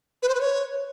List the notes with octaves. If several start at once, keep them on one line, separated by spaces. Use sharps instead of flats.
B4
C5
B4
C#5